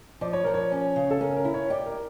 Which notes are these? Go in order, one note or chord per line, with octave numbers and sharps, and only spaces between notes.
F3 D5
C#5
F3 A#4
C#5
C#4
C#3
A4
C#4 A#4
A#4
E4
C#5
G4 D5
A#4